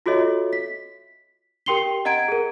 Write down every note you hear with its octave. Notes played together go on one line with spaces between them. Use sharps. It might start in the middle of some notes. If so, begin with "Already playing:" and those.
F4 F#4 A4 C#5 D#5 E5
B6
G4 A#4 G5 C6 C7 G7
D#5 F#5 A#5 G#6 D7
G#4 A#4